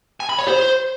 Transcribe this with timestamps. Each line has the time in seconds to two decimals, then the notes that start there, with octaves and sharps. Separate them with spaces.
0.20 G#5
0.29 B5
0.39 C#5
0.48 C5